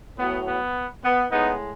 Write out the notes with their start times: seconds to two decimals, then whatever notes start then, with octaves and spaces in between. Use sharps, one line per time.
0.18 A2 F#3 B3
0.47 B3
1.04 B3
1.31 A2 G#3 B3 D#4